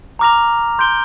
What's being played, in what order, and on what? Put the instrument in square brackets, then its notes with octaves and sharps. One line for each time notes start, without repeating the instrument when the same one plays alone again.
[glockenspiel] A#5 D6 F6 A#6 F7
C6 G6 D7 G7